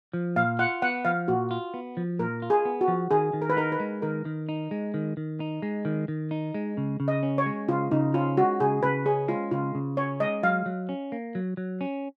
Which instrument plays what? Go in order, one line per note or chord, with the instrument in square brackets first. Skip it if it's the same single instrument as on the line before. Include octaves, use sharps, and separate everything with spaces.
[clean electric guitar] F3
[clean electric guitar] A#2 [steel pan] F5
[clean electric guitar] F4 [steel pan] F#5
[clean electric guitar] B3 [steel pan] F#5
[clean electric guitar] F3 [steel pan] F5
[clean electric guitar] A#2 [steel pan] F#4
[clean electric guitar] F4
B3
F3
[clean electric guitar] A#2 [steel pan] A#4
[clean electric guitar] F4
[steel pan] G#4
[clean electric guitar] B3
[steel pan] F#4
[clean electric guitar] F3
[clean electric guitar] D#3 [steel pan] G#4
[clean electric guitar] D#3
[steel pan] A#4
B4
[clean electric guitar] D#4 [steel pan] A#4
[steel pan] B4
[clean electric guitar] G#3
[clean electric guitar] D#3 [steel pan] A#4
[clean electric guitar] D#3
D#4
G#3
D#3
D#3
D#4
G#3
D#3
D#3
D#4
G#3
C#3
C#3
[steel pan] D#5
[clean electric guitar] C#4
[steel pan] C#5
[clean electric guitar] G#3
[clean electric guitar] C#3 [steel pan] F4
[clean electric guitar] C#3 [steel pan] D#4
[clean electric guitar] C#4 [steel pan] F4
[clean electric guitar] G#3 [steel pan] F#4
[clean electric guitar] C#3 [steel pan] G#4
[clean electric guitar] C#3 [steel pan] B4
[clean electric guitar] C#4 [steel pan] G#4
[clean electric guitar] G#3 [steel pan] F4
[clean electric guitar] C#3 [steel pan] F4
[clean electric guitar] C#3
[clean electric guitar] C#4 [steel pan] C#5
[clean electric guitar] G#3 [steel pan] D#5
[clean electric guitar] F#3 [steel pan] F5
[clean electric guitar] F#3
C#4
A#3
F#3
F#3
C#4